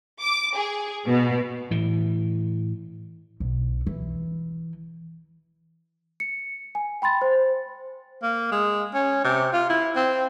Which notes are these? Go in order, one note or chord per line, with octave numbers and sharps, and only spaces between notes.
D6
G#4
B2
A2 E3
B1
E3
C#7
G#5
G5 B5 C6 A6
C5
A#3
G#3
C#4
C3
F4
E4
C4